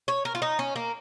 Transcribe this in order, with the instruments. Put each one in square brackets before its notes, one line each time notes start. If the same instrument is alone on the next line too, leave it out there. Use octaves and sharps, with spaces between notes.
[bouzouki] C#5
A#4
F4
D#4
C#4
A#3